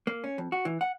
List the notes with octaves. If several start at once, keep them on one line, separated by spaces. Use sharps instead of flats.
A#3
C#4
F2
F#4
E3
F#5